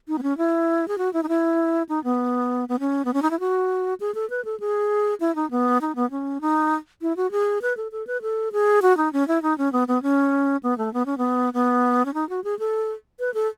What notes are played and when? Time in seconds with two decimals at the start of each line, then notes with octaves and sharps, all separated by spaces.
0.08 D#4
0.18 B3
0.23 C#4
0.38 E4
0.88 G#4
0.98 F#4
1.13 E4
1.23 D#4
1.29 E4
1.89 D#4
2.04 B3
2.69 B3
2.80 C#4
3.05 B3
3.14 C#4
3.22 D#4
3.31 E4
3.40 F#4
4.00 G#4
4.15 A4
4.30 B4
4.45 A4
4.60 G#4
5.20 E4
5.35 D#4
5.51 B3
5.81 D#4
5.96 B3
6.11 C#4
6.41 D#4
7.02 E4
7.17 F#4
7.31 G#4
7.62 B4
7.77 A4
7.92 A4
8.07 B4
8.22 A4
8.52 G#4
8.82 F#4
8.97 D#4
9.13 C#4
9.28 E4
9.43 D#4
9.58 C#4
9.73 B3
9.88 B3
10.03 C#4
10.63 B3
10.78 A3
10.94 B3
11.06 C#4
11.18 B3
11.54 B3
12.05 C#4
12.14 D#4
12.29 F#4
12.44 G#4
12.59 A4
13.20 B4
13.34 A4